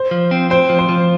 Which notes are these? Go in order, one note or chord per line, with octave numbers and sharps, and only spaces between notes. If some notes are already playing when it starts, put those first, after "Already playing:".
Already playing: C5
F3
C4
C4 C5
F3
C5
F3